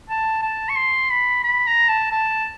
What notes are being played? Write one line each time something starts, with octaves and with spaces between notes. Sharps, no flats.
A5
A5
C#6
C6
B5
B5
A#5
A5
A5